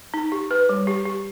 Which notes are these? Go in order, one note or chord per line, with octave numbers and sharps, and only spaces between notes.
D#4
G4
B4
G3
G4
G4